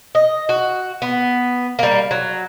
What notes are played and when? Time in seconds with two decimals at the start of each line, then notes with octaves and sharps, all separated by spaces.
0.15 D#5
0.49 F#4
1.02 B3
1.79 G3 A#3
2.11 F#3